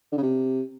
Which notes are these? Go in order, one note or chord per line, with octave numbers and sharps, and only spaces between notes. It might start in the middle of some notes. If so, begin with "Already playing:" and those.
D3
C#3
C3